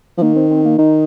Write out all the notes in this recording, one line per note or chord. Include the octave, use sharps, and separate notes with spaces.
F3
D#3 A#3
C4
C4
A#3
D#3 D#4